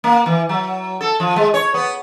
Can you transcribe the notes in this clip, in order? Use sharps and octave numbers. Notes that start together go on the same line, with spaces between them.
A#3
E3
F#3
A4
F3
G#3
C#5
B3